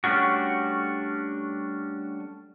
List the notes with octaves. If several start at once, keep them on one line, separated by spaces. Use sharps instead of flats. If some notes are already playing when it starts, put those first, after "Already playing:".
G3 A3 C#4 D4 F#4